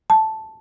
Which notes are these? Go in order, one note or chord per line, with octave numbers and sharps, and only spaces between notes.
A5